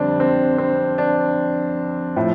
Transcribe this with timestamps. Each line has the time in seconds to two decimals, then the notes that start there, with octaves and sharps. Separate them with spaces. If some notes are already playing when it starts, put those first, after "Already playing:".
Already playing: F2 D3 G3 C4 D4
0.20 C4
0.58 C4
0.98 D4
2.16 A2 F3